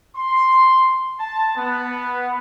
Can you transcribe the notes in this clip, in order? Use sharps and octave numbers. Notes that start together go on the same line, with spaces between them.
C6
A5
B3